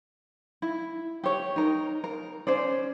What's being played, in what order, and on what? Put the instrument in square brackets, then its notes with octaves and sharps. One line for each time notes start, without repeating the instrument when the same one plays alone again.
[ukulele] E4
G4 C#5
D#4 A#4
A#4
C#4 C5 D5